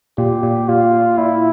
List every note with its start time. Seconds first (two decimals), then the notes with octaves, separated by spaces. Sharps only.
0.18 A#2 G4
0.43 A#2
0.69 A#2 F4
0.93 A#2
1.18 A#2 E4